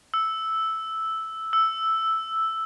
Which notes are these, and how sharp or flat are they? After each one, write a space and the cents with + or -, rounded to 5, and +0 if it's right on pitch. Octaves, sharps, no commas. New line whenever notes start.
E6 -5
E6 +0